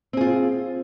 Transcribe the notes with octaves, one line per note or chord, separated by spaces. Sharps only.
C4 F4 G#4